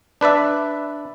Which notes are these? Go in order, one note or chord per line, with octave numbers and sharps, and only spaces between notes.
D4 B4 D5 E5